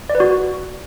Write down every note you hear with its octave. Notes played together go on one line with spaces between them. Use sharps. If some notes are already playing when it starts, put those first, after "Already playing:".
D5
B4
F#4